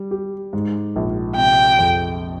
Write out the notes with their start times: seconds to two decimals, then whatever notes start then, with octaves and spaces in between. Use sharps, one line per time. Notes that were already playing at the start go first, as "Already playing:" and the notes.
Already playing: G3
0.11 G4
0.53 G#2
0.96 A#1
1.37 C3 G5
1.78 F2